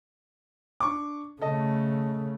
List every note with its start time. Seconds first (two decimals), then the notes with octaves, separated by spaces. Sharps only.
0.80 D4 C#6 D6
1.41 C#3 A3 A4 D#5